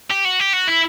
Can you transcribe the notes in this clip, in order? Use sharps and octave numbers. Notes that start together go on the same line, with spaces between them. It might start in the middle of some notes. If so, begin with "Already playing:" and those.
G4
F#4
G4
F#4
E4